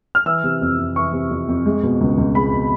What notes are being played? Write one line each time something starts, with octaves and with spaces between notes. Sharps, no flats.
F6
E3 E6
C3
F2
F2
E3 C#6
C3
F2
F2
G#3
B2
C#2
C#2
G#3 B5
B2